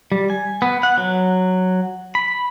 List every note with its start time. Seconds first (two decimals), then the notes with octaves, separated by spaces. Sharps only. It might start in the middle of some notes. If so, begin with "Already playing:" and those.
0.12 G3
0.30 G#5
0.62 B3
0.83 F#5
0.98 F#3
2.15 B5